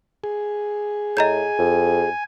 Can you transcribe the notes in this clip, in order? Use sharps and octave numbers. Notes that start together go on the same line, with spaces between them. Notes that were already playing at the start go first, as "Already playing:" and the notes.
G#4
A2 D#5 G#5 A#5 G6
F2